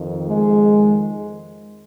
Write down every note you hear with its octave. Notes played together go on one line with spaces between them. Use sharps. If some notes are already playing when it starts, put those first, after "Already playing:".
Already playing: F2 D#3
G#3